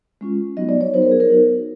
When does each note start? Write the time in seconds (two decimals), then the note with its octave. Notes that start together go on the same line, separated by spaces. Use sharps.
0.21 G#3 C#4 F4
0.57 F#3 B3 D#4 F#4 D#5
0.69 D5
0.81 C#5
0.94 F#3 B3 D#4 F#4 C5
1.02 A#4
1.11 G#4
1.20 A#4
1.29 F#3 B3 D#4 F#4